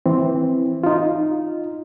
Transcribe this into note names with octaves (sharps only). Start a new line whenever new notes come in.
E3 C4
D#4 F4